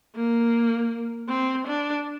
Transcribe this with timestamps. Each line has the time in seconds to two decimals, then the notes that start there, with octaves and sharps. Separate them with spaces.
0.16 A#3
1.29 C4
1.67 D4